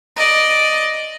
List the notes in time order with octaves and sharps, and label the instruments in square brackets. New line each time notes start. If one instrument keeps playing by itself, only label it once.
[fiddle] D5 D#5